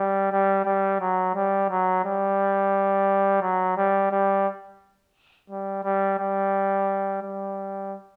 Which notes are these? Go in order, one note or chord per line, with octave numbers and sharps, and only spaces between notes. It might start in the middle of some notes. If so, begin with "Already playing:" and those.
Already playing: G3
G3
G3
F#3
G3
F#3
G3
F#3
G3
G3
G3
G3
G3
G3